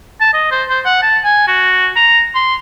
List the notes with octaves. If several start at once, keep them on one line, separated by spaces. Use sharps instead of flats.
A5
D#5
C5
C5
F#5
A5
G#5
F#4
A#5
C6